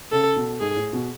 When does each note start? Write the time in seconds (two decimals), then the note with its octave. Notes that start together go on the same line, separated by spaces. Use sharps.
0.12 C#3 A4
0.36 B2
0.60 G#2 G#4
0.76 A2
0.93 B2